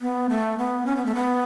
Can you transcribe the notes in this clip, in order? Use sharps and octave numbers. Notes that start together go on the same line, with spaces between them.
B3
A3
B3
C#4
B3
A3
B3